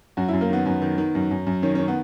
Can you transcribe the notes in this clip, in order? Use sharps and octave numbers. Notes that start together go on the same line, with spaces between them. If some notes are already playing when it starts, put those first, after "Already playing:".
F#2 F#4
E4
F#2
A#3
D#3 B3
F#2 B3
D#3
D#3
F#2
F#2
F#2
D#3 C#4
C#4
D#3
B3